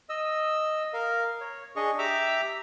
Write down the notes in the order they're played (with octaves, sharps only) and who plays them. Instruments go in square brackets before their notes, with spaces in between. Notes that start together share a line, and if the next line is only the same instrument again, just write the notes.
[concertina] D#5 E6
A#4 F5
C#5
D4 G#4 D#5 C#6
G4 E5 A#5 D6 E6